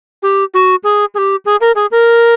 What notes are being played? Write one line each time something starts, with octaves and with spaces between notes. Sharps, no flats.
G4
F#4
G#4
G#4
G4
G#4
A#4
G#4
A#4